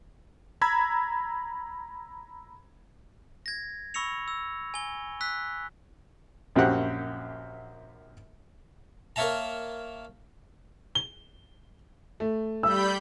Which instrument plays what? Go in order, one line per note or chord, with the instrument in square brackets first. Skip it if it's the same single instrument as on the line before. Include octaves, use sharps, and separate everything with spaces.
[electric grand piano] A#5 B5 E6 G#6
[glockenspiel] G#6 A#6
B5 C#6 E6 A#6 C#7 F7
E6
G#5 G7
E6 F#6 B6
[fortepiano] A#1 F#2 C4 F#4 G4 F#5
[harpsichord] A#3 A#4 C#5 E5 A5 A#5
[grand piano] G7
A3
[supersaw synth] G3 B5 G6 [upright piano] E6